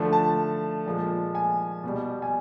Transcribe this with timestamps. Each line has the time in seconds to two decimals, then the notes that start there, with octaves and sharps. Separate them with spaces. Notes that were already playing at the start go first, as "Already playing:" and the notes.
Already playing: D3 F3 A3
0.13 A5
0.86 A#2 F3 G#3
1.35 G#5
1.84 B2 G3
2.22 G#5